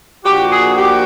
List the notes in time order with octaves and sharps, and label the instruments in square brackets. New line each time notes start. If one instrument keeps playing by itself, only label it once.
[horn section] A#2 F3 A#3 D4 F#4 [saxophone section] G4
[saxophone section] G#4
G4